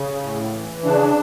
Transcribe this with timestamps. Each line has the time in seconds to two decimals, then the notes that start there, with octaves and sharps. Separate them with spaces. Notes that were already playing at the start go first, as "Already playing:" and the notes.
Already playing: C#3
0.23 A2
0.53 E3
0.84 C#3 D4